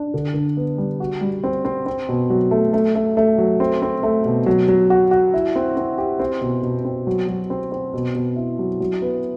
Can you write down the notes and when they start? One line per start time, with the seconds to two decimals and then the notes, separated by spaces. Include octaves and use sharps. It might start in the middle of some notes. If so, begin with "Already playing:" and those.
Already playing: D4
0.14 D3
0.34 D3
0.57 B3
0.78 G3
1.00 F#4
1.21 G3
1.44 C4
1.65 C4
1.86 C4
2.09 B2
2.30 F#3
2.51 A3
2.73 A3
2.95 A3
3.17 A3
3.38 F#3
3.60 C4
3.82 C4
4.03 A3
4.25 B2
4.46 F#3
4.68 F#3
4.90 F#4
5.11 F#4
5.34 E4
5.56 C4
5.77 C4
5.98 G4
6.19 C4
6.41 B2
6.63 B2
6.85 C4
7.07 F#3
7.28 F#3
7.50 C4
7.72 C4
7.94 B2
8.15 B2
8.36 E4
8.59 F#3
8.80 F#3
9.02 B3